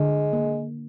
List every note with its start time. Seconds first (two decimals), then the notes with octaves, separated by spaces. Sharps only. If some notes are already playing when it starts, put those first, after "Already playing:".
Already playing: D3 G#3
0.33 A#3